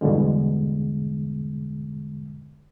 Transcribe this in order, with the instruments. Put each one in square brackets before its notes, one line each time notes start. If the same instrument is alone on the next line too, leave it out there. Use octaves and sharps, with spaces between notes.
[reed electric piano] E2 G2 B2 D3 G#3